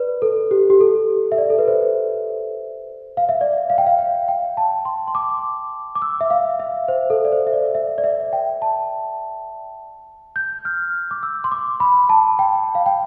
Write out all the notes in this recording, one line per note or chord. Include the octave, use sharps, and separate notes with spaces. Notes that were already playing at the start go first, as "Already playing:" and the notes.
Already playing: B4 D5
A4
G4
G4
A4
E5
D5
A4
B4
C5
F5
E5
D5
F5
G5
F5
G5
G5
A5
C6
C6
D6
D6
E6
E5
F5
E5
C5
A4
D5
C5
E5
D5
E5
D5
E5
G5
A5
G6
F6
D6
E6
C6
D6
B5
A5
G5
F5
G5